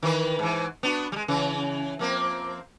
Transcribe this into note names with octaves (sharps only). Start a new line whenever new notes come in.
D#3 E3 B4
G#2 E3
B3 D4 F#4
G3 G#3
C#3 E3
F3 A#3 C4